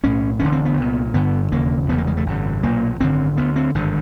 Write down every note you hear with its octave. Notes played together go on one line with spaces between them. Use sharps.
B1 A2 C#4
E1 D2 D3 C#4
C4
B3
C2 A#2
G1 G2 D3 B3
E1 D#2 C#3 A#3
F1 E2 C#3 B3
A#3
G#3
A3
G#1 F#2 C#3
B1 A#2 A#3
G#1 F#2 D3 C4
D2 D3 B3
C4
G#1 G2 D3